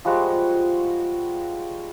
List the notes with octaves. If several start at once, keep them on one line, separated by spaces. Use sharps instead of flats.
F3 G3 G#3 F#4